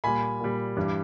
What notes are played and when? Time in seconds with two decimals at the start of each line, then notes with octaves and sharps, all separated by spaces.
0.04 A#2 G3 G#5 B5
0.41 A#2 G3
0.77 G2 E3 G3